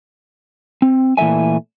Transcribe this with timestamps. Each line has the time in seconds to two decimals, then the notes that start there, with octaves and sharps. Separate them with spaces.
0.82 C4
1.17 A#2 E3 A3 E5 G#5